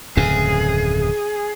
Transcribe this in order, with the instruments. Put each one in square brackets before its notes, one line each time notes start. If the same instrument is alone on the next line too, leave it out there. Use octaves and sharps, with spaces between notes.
[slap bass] D1 F2 C#3 [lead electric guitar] G#4